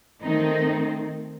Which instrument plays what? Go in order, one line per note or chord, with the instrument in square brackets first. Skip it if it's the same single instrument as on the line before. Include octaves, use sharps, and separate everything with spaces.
[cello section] D#3 A3 C4 D#4